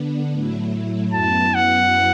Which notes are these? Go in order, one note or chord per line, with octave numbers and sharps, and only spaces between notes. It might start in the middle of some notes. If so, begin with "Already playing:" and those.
Already playing: D3 B3 D4
A2 F#3 A3 E4
F#2 F#3 B3 E4 A5
F#5